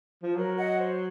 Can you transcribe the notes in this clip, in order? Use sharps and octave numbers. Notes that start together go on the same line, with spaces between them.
F3
F#3 A#4
D#5 F#5
C5